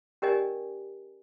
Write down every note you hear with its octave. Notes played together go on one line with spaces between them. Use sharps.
C#4 G4 A#4 D5 D#5 G#5